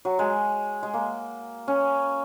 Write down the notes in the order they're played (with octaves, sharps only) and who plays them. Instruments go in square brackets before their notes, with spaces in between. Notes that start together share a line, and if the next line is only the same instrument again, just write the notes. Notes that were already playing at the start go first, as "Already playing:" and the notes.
[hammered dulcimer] F#3
G#3
G#3
A#3
C#4